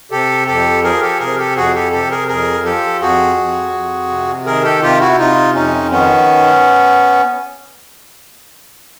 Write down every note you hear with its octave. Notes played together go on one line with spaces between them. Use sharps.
C3 G4 A4
F2 G4 A4
F3 G#4 A#4
G4 A4
C3 G#4 A#4
G4 A4
F2 F#4 G#4
G4 A4
C3 G4 A4
G#4 A#4
F2 G#4 A#4
F3 G4 A4
F2 F#4 G#4
F2
F2
C3
D#3 G#4 A#4
G4 A4
C3 F4 G4
E4 F#4
C3 D#4 F4
F2 C#4 D#4
D#3 B3 C#4